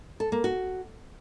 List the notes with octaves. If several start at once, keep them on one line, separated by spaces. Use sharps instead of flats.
A4
A#3
F#4